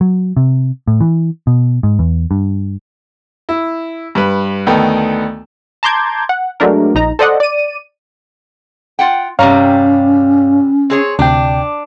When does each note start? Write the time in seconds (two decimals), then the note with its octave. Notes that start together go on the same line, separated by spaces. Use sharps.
0.01 F#3
0.37 C3
0.87 A2
1.01 E3
1.47 B2
1.83 G#2
1.99 E2
2.31 G2
3.49 E4
4.15 G2 B4
4.66 D2 D#3 B3 A4 G5
5.83 A5 A#5 C6 D6 G6 G#6
6.29 F#5
6.60 F#3 G#3 A3 D4 A#4
6.95 A#1 D#4 A#5
7.19 A4 C5 D5 D#5 F#5
7.40 D5 D#7
8.99 F4 F#5 G5
9.39 G2 C3 G3 C#4 C#5 F5 A#5
10.90 C4 G#4 C#5
11.19 D2 C3 D4 G5